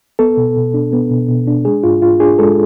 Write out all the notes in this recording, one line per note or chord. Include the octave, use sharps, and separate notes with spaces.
B3 A4
B2
B2
D4
B3
B2
B2
D4
G#3 G#4
G#2 F4
G#2 F4
D4 G#4
G#3 A4